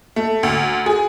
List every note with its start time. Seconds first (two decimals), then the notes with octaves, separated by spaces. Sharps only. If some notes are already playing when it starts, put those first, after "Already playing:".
0.16 A3
0.43 D2
0.86 G#4